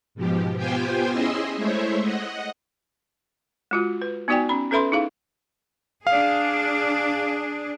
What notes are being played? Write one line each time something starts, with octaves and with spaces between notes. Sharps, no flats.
G#2 B2 F3 G4
B3 F4 G4 C5 G5 G#5
C#4 E4 G#4 D#5 E5 C6
G#3 A3 E4 C5 C#5 E5
D#5 F#5
G#3 F4 F#4
B4
B3 D#4 F#4 D5 G5 G#5
C#4 B5
C#4 A4 B4 E5 B5 C6
D#4 E4 G#4 F5
D4 G#4 F5